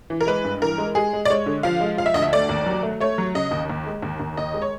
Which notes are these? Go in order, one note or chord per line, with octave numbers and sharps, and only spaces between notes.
E3
A#4
G#3 B4
G2
E3 A#4
G#3
G#3 G#4
G#3
D5
G#3 C#5
D3
F3 F5
G#3
F3 F5
E5
D2 D#5
E5
A3 D5
D#2
F#3
A3
A3 C#5
F#3
C#3 D#5
D#2
D#2
G#3
D#2
D#2
D#2 D#5
G#3
C#5